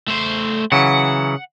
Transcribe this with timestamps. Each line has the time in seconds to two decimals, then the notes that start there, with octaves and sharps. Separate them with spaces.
0.08 A3 C5
0.72 C#3 E3 F#3 F#5